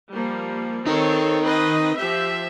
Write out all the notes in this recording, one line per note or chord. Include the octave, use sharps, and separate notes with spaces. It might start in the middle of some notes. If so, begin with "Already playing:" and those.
F3 G3 A#3
C4 D#4 A4 A#4 C#5
C4 B4 D#5
F3 G4 E5